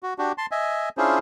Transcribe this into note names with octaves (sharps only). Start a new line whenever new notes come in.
F#4
D4 F#4 G4
A5 C6
D#5 E5 G#5
C#4 D4 E4 F4 G#4 C5